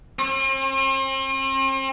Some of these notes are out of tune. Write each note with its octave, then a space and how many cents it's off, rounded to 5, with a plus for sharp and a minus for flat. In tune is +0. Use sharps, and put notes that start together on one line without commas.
C4 +45